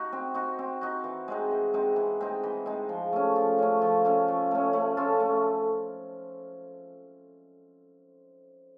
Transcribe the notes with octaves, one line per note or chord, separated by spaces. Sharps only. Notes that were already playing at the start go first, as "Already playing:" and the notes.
Already playing: D#4 F#4
C4
D#4 F#4
C4
D#4 F#4
E3
G#3 C4 D#4
E3
G#3 C4 D#4
E3
G#3 C4 D#4
E3
G#3 C4 D#4
F3
A3 C#4
F3
A3 C#4
F3
A3 C#4
F3
A3 C#4
A3
C#4 F4 A4
A3